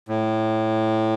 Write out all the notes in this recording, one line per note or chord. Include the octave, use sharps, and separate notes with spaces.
A2